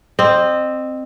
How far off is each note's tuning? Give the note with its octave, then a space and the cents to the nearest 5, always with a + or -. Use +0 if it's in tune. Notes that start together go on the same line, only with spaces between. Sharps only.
C4 +0 D#5 -30